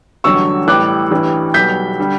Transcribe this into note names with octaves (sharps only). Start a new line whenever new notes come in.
A1 G2 D3 F#3 C#6 E6
A1 A2 E3 G3 D6 F#6
A1 G2 E3 G3
B1 B2 G3 G6 B6
D3 G3